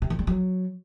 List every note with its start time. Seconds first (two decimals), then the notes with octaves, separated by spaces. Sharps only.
0.02 C3
0.10 D#3
0.19 G3
0.27 F#3